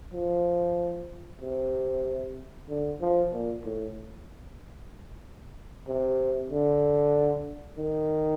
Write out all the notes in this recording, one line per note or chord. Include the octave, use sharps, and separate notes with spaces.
F3
C3
D3
F3
A#2
A2
C3
D3
D#3